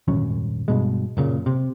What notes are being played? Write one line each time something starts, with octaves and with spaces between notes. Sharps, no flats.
D#1 G#1 F#2 C#4
G2 B2 G#3
F#1 A#2 C#3
C3